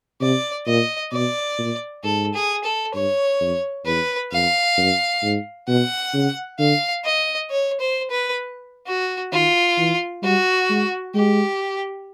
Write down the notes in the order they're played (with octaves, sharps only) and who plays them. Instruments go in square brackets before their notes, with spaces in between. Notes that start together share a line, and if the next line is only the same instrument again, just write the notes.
[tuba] C3 [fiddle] D5
[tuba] A#2 [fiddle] D#5
[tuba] B2 [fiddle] D5
[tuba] A#2
[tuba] G#2 [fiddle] A4
[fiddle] G#4
A4
[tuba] G2 [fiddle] C#5
[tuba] F2
[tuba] E2 [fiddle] B4
[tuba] F2 [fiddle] F5
[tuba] F#2
G#2
[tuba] B2 [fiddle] F#5
[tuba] C#3
[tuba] D3 [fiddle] F5
[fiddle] D#5
C#5
C5
B4
F#4
[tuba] D#3 [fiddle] F4
[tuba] E3
[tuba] G3 [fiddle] F#4
[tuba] G#3
[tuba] G#3 [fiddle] G4